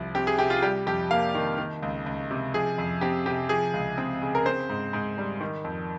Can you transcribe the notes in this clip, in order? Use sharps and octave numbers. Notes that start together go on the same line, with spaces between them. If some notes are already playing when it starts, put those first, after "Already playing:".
Already playing: C2 F3
C4 G4
G#4
C3 G4
F4
G3 G4
F2 G4
A#3 F5
D#3
D#3
C#2
C#2
C3
F3 G#4
F2
C4 G4
C3 G4
F3 G#4
C#2
C4
C#3
A#4
C4 C5
G#2
G#2
G3
D#3
F2